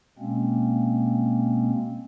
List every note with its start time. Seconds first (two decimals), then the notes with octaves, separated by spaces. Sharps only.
0.19 B2 G#3 A#3 C4 C#4